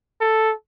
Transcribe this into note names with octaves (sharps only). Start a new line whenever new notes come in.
A4